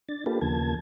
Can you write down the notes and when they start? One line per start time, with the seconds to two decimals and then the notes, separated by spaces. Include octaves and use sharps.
0.09 D4 A6
0.26 A#3 D4 F4 G4 A4 B4
0.41 D#2 C#3 F3 A#3 A5 G#6